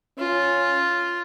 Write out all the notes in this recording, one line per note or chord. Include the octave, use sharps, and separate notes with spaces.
C#4 F4